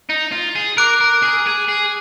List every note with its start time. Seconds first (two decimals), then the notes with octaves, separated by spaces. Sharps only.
0.10 D#4
0.32 F4
0.56 G#4
0.77 A#4 D6 F#6 D7
1.01 A#4
1.23 G#4
1.47 G#4
1.69 G#4